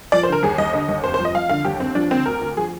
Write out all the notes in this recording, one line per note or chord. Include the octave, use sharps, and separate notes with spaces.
F3 D5
C5
D3 A#4
D#2 G#4
D#2 D#5
D3 D#5
D#2
F1 C5
C5
F3
D#5
F3 F5
D3 F5
D#2 G4
D#2 C4
F3 D4
D3 C4
D2 A#4
D2
F3 G#4